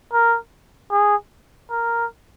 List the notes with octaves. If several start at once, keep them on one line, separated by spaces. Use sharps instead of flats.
A#4
G#4
A#4